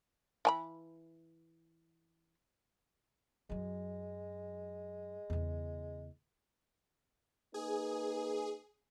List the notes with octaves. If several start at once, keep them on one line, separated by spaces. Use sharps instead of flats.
E3 G#5 B5
F#2 F#3 G#3
E2 C#3
A#3 D#4 G#4 B4